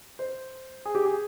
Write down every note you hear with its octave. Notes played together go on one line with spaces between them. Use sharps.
C5
G#4
G4
G#4